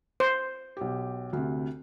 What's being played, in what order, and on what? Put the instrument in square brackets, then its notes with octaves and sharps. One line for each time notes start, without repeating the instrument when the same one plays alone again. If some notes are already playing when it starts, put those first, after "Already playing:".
[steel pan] C5
[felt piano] B1 G4
D2 C3